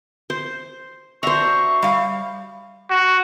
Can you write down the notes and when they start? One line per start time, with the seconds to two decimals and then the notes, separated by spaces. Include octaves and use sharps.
0.30 C5
1.23 D4 F#4 C5 E5 A#5 C#6
1.82 G3 F5
2.90 F#4